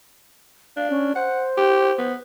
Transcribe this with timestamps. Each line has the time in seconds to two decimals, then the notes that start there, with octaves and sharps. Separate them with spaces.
0.77 D4 F5
0.90 C#4
1.15 C5 F#5
1.57 G4
1.98 B3